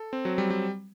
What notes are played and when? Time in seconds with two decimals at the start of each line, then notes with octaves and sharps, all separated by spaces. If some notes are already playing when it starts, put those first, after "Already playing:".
Already playing: A4
0.13 C4
0.25 F#3
0.38 G3
0.50 G3